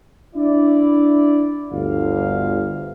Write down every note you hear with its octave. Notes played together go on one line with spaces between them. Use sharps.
D4 E4 D5
G1 D2 F5